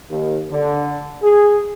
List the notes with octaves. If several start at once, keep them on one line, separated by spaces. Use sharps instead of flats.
D#2
D3
G#4